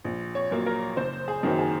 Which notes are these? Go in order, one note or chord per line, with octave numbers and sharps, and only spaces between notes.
A#1
C#5
A#2 F#3 A#3
A#4
F#1 C5
G#4
F#2 D#3 F#3 A#3
G#4